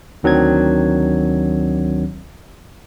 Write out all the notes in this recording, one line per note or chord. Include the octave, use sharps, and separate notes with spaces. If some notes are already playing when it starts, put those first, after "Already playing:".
D2 D#3 F#3 C4 D4 G#6